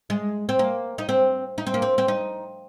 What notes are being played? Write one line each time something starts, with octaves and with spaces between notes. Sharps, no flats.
G#3
C4
A#3
D#4
C4
D#4
C4
A#3
C4
C4
D#4